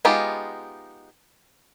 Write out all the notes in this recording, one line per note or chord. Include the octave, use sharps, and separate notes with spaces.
G#3 B3 D#4 F4 G4